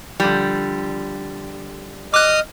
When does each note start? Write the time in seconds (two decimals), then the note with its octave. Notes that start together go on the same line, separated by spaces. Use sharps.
0.20 D3 F3 G3
2.14 D#5 D6 D#6 F6 F#6